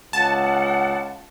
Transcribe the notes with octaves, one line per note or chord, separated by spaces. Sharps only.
C#2 F#5 A5